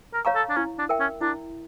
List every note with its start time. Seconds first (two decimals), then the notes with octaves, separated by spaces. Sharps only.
0.14 A#4
0.25 C#5 F5 A#5 C#6
0.36 A4
0.50 D4
0.57 C#4 E4
0.78 D4
0.89 A#4 E5 G5
1.00 C#4
1.21 D4 E4